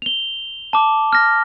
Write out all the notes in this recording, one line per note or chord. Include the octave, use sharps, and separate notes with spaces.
F7 G7
A5 D6
F6 A#6